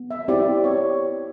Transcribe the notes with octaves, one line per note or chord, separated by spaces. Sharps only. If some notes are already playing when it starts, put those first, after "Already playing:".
Already playing: B3
E5
C4 E4 G4 D5
C#5